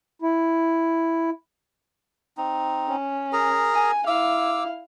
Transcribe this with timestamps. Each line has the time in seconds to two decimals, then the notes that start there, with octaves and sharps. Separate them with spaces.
0.22 E4
2.37 C4 D#4
2.88 C#4
3.33 G#4 A#4 A#5
3.74 G#5
4.07 E4 F5 D6 E6